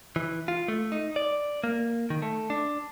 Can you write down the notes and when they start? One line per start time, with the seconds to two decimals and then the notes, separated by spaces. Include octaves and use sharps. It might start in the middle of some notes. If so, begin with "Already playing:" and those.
0.16 E3
0.48 F4
0.68 A3
0.92 D#4
1.16 D5
1.64 A#3
2.10 D#3
2.22 A3
2.50 D4